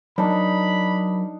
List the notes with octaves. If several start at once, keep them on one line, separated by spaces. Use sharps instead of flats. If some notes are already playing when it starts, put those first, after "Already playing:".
F#3 D4 D#4 A#4 C5 B5